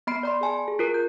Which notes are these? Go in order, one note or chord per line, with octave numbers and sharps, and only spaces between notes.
B3 D#5 B5 C7 D7
D5 B5 C6
G#4 G#5 A5
G#4
F4 A#4
G6